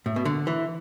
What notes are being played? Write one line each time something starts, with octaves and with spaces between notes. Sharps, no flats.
A2
B2
D3
E3